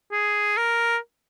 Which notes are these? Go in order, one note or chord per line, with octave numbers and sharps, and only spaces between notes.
G#4
A#4